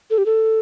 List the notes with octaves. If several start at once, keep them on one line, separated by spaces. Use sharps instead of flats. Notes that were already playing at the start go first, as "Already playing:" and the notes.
A4
G4
A4